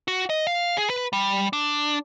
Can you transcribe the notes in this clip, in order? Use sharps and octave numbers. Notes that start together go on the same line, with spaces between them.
F#4
D#5
F5
G#4
B4
G3
D4